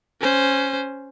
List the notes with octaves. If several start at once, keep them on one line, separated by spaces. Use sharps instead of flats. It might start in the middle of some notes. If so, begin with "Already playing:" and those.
C#4 C5